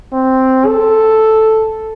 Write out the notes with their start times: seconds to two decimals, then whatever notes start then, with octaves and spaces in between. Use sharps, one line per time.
0.13 C4
0.67 A4